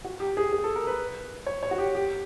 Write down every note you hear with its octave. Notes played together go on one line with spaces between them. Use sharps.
F#4
G4
G#4
G#4
A4
A#4
B4
C#5
C#5
F#4
G4
G4